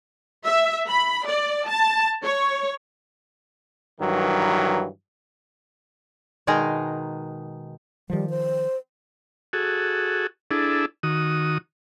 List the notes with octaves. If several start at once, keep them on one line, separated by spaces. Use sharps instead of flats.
E5
B5
D5
A5
C#5
G2 D#3 E3 F#3
B2 D#3 G#3 D#4 G#4 A#4
D#3 F3 G3
C5
F#4 G#4 A4
D4 E4 G#4 A4
D#3 F#4 D#6